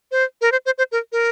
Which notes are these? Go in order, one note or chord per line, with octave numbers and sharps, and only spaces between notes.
C5
A#4
C5
C5
C5
A#4
A#4